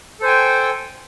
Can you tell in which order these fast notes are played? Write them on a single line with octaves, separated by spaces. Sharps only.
A4 C5 G#5 G5